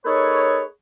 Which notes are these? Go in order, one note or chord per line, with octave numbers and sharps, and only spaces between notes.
A#3 D#4 G#4 A4 B4 C#5